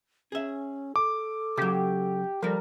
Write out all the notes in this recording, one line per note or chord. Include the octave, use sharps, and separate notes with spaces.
C#4 G#4 E5
A4 D6
C#3 F#3 G4
F3 G3 A4 A#4